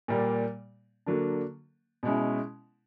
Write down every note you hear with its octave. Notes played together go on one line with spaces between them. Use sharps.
A#2 G3 A#3
D3 F#3 A#3 D4
B2 G#3 C#4 E4